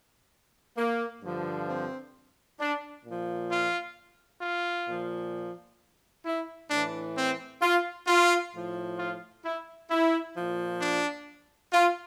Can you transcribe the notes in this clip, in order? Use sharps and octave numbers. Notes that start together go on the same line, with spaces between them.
A#3
G2 D3 F3
C4
D4
A#2 F3
F4
F4
A#2 F3
E4
A2 E3 D4
C4
F4
F4
A2 F3
F4
E4
E4
A#2 F3
D4
F4